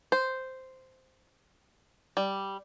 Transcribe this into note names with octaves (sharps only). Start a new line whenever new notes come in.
C5
G3